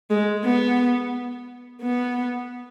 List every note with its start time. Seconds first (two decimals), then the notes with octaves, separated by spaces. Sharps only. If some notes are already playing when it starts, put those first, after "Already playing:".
0.10 G#3
0.45 B3
1.82 B3